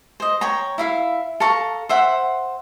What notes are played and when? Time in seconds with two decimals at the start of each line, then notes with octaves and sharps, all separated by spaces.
0.20 C5 D#5
0.41 C#5 G5 A#5
0.78 E4 E5 F5
1.40 A4 F5 A#5 C#6
1.89 C5 E5 F#5